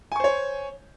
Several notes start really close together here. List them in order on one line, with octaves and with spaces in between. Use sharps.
G#5 C#6 C5 C#5